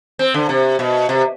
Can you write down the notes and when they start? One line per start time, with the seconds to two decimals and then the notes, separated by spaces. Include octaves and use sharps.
0.19 C4
0.34 D3
0.49 C3
0.79 B2
1.09 C3